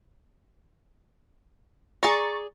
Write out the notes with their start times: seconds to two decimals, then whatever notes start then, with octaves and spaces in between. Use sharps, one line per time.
2.03 G#4 D5 A#5 C#6 A6